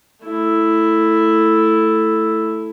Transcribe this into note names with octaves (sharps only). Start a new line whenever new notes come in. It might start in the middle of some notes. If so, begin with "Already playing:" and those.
A3 E4